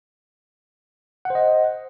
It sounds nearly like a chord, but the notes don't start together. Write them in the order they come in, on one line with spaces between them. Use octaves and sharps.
F#5 C5 D#5